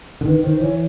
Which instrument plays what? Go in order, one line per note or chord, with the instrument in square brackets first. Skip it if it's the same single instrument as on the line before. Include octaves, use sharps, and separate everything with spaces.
[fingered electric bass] D3
[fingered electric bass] D#3 [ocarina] B4
[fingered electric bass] D#3 [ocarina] C5
[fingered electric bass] E3 [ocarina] C#5